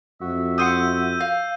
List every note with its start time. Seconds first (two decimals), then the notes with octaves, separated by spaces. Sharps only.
0.21 F2 F#4 E5
0.58 F#5 C6 D#6 E6 G6 D#7
1.21 F5